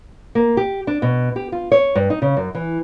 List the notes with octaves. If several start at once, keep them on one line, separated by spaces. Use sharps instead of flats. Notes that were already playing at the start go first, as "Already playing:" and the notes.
A#3
G4
D4
B2
G4
F4
C#5
G2
D#4
C#3
F#2
E3